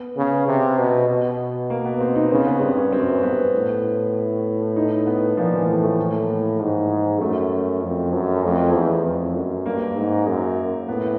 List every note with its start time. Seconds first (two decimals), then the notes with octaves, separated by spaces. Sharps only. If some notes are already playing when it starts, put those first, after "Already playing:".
Already playing: B3
0.17 C#3 B3
0.48 C3
0.78 B2
1.09 B2
1.70 A#3
1.85 B3
2.01 C4
2.16 D#4
2.31 C#3 C4
2.47 B3
2.61 G2 C4
2.77 C#4
2.92 F#2 C4
3.22 G2 B3
3.54 A2
4.76 D#4
5.07 B3
5.37 A#2 F3
5.53 E3
5.62 F3
5.68 A2 E3
5.83 A3
5.99 A#3
6.60 G#2
7.21 F#2 A3
7.82 F2
8.13 F#2
8.43 F2 A3
8.74 E2
9.05 F2
9.35 F#2
9.66 G2 A#3
9.96 G#2
10.27 F#2
10.88 A2 B3